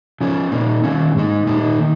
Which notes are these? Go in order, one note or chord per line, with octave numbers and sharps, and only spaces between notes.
C#3 F3 C#4
A#2 A#3 D#4
D#3 A#3 C#4
G#2 G#3 D#4
A#2 A#3 D#4
D#3